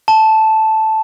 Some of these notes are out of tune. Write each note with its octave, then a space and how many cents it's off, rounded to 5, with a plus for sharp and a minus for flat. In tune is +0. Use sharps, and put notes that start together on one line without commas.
A5 -5